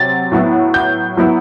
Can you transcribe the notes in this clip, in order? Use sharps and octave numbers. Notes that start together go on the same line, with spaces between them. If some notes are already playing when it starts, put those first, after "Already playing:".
Already playing: C3 F#3 C4 A6
A2 F#3 B3 E4
G6
F#3 B3 E4